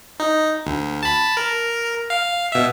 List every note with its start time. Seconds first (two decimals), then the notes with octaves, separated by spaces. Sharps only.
0.20 D#4
0.66 D2
1.03 A5 B5
1.37 A#4
2.10 F5
2.52 B2 E5